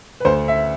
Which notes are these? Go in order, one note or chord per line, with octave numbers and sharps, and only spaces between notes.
B4
D2 C5
E5